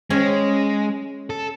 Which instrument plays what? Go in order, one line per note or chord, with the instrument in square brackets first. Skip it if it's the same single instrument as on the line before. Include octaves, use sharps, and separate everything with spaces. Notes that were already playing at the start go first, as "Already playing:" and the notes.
[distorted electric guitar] G#3 [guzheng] C#4
[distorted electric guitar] A4